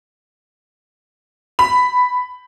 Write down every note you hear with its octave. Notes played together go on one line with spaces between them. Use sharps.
B5